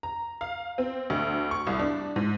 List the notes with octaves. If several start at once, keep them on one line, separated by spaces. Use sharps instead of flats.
A#5
F5
C4
D2
C#6
C2
D4
G#2